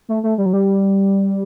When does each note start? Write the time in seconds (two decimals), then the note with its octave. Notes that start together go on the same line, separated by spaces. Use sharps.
0.09 A3
0.23 A3
0.38 G3
0.46 F#3
0.53 G3